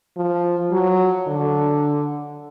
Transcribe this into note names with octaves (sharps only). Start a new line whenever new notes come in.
F3
F#3
D3